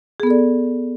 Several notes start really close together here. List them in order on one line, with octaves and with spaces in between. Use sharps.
G#4 B3 A4 D5